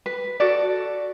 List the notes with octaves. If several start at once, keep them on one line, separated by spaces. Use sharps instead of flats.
B4
F#4 A4 D5